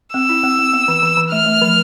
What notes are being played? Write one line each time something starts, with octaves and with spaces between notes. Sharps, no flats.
C4 E6
E4
C4
C4
B3
E3
E3
E3
A3 F6
A3
F3